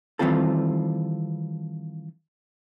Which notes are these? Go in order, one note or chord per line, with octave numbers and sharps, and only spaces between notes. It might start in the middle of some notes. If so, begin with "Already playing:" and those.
D#3 E3 G3 C4 F4 A4